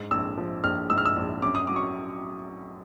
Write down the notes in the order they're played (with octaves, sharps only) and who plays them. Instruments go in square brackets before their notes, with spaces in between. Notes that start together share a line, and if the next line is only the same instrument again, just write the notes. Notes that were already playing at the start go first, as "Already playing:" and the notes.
Already playing: [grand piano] G#2
A#1 E6
F3
A#1 F6
G#2 E6
F6
E6
A#1
F#2 D6
D#6
F#3 D6
C#6